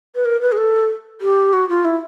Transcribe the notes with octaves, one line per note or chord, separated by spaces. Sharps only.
B4
A#4
B4
G#4
A4
G4
F#4
F4
E4